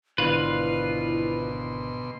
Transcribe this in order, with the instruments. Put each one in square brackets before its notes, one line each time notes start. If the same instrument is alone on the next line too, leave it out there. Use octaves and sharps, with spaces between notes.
[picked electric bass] G#1 D3 [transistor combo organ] B2 C6 [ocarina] E4 [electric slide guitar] F4 B4